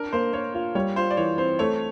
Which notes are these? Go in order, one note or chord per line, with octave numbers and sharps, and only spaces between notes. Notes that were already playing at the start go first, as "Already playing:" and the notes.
Already playing: D4 A#4
A#3 C5
A#3 C#5
F4
G3 C#5
F4 C5
D5
E3 C#5
C4 C5
A3 C#5